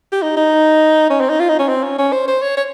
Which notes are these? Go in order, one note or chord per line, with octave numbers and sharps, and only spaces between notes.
G4
D#4
D#4
C#4
C4
D#4
F4
D#4
C#4
C4
C#4
C#4
C5
C5
C#5
C#5